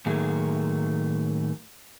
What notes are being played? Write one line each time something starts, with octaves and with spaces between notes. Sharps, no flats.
A2 D#3 F#3 A3 A#3 G#4